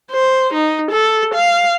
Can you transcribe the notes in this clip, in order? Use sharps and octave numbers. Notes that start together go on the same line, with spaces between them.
C5
D#4
A4
F5